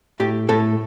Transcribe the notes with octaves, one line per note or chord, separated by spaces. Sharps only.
A2 G4
A2 A4